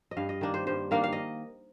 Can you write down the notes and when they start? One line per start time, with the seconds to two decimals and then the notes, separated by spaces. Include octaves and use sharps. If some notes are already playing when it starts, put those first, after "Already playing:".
0.11 D#5
0.17 G2 F5
0.29 D#5
0.41 D#3 A#3 D4
0.54 C5
0.67 G2 C5
0.91 D#3 A#3 D4 F5
1.04 F5
1.13 D#5